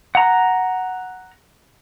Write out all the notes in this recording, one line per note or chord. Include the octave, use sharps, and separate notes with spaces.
F#5 A#5